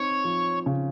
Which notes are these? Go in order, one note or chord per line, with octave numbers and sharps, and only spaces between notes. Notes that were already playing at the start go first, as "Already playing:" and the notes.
Already playing: C4 D#4 C#5
F3
C#3